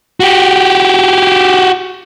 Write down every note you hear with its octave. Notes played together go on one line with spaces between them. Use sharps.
F#4 G4